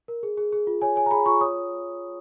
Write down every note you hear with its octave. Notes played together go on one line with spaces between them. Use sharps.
A#4
G#4
G#4
G#4
F4
C#5 G#5
C#5 G#5
A#5
G#4 B5
F4 C#6
C#5 D#6